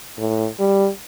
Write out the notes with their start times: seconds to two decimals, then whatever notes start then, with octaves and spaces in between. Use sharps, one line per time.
0.18 A2
0.59 G3